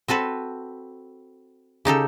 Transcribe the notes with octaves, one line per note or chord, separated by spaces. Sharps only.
C4 F#4 A4 B4
C#3 D#4 G4 A4